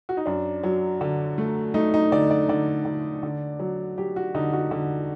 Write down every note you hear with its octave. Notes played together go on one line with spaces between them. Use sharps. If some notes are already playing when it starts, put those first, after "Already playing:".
F#4
D#4
F#2 D4
F#3
D3
A3
A3 D#4
D#4
D3 D5
D5
D3 D5
D3
D3
F#3
F#3 G4
F#4
D3 D#4
F#4
D3